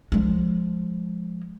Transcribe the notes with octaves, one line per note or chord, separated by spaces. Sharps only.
F3 G#3